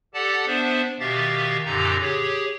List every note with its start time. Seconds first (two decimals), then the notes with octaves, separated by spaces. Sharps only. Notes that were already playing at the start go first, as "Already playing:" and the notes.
0.14 G4 A4 D5 F#5 A5
0.47 B3 D4 C5 E5
1.00 B2 D#3 G4 E5 F5 A6
1.66 F#2 A#2 D3 D#4 G4 A#5
2.01 G4 G#4 C#5